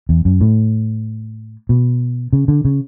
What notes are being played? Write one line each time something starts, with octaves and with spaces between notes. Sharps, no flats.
E2
F#2
A2
B2
C#3
D3
C#3